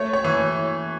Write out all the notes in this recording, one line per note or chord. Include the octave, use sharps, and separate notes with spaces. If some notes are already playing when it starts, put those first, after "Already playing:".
Already playing: A3 C#5
C#5
E3